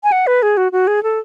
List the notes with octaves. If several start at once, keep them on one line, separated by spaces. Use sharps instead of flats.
G#5
F#5
B4
G#4
F#4
F#4
G#4
A4